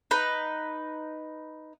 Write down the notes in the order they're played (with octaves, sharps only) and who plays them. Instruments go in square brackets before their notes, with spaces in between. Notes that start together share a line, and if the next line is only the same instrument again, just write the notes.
[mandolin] D#4 B4